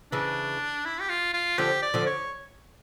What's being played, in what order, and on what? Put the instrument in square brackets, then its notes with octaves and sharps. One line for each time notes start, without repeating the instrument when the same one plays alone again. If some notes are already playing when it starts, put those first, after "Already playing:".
[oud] C#3 E3 [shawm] D4
[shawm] E4
G4
F4
F4
[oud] D3 F3 [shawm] G4
[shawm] D5
[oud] D3 F3
[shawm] C#5